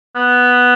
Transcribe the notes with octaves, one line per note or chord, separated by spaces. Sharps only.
B3